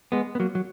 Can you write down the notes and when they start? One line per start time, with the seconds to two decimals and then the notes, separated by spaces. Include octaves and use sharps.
0.12 G#3 B3
0.35 B3
0.40 F#3 A#3
0.55 F#3